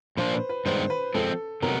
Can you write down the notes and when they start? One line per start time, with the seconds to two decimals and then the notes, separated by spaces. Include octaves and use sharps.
0.17 A#2 F3 A#3 D4 F4 C5
0.33 B4
0.49 B4
0.66 G2 D#3 G#3 B3 D4 C5
0.90 B4
1.14 F3 G#3 C4 A4
1.62 C3 D#3 F#3 B3 A#4